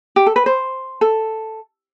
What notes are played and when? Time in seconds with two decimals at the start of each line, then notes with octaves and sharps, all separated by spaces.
0.16 G4
0.26 A4
0.36 B4
0.46 C5
1.01 A4